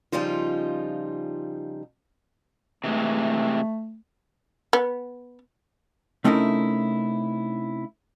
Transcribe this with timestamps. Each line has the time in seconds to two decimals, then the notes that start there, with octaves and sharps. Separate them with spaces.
0.12 C#3 F3 G3 D#4 F4
2.84 C3 E3 G#3 A3
4.73 B3
6.24 C3 A3 C#4 D#4 E4 A#4